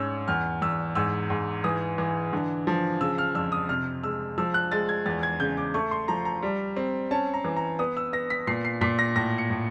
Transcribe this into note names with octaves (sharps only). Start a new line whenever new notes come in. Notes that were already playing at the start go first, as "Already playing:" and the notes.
Already playing: G#2 C#4 E6
E2 F6
E2 E6
G#2 E6
G#2
E3 D#6
E3
D3
F3
C#3 E6
F6
F2 E6
D#6
C3 F6
G#3 E6
F3 E6
F#6
G#3 A6
G#6
E2 A6
G#6
C#3 G6
D6
A3 C#6
C6
F3 A#5
A#5
G3
C4
C#4 A5
A#5
E3
A#5
B3 D#6
E6
B3 A#6
B6
A#2 C7
C7
A#2 B6
A#6
A2 A#6
C#7
A2